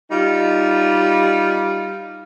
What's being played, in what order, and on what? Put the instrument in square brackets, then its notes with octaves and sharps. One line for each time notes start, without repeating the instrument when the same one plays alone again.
[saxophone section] G3 D#4 F4